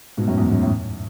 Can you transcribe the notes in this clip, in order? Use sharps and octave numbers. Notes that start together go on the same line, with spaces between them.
G#2 B2
F#2 A2
E2 G#2
F#2
A2